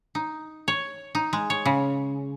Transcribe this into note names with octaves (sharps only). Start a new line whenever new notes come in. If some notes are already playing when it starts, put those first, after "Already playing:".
D#4
C#5
D#4
G#3
C#5
C#3